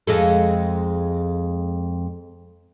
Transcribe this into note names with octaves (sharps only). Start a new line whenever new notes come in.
F2 G#3 A4